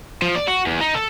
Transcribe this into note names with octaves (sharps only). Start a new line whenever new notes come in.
F3
D5
F#4
E2
D#4
A4